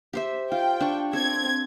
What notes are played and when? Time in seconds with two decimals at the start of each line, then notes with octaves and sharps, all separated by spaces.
0.13 G4 C5 E5
0.52 F4 G5
0.80 D4 C#6
1.13 C4 A4 G#6